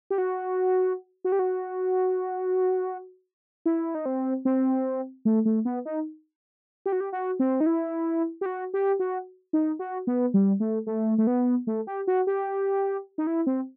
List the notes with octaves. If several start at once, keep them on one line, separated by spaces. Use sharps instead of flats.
G4
F#4
F#4
G4
F#4
E4
D#4
C4
C4
A3
A3
B3
D#4
G4
F#4
G4
F#4
C4
D#4
E4
G4
F#4
G4
F#4
D#4
F#4
B3
G3
A3
A3
A3
B3
A3
G4
F#4
G4
D#4
E4
C4